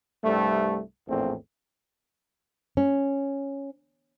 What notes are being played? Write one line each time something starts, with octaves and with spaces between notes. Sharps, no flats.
C2 G2 G3 A3
A#1 E2 A2 A3 C4
C#4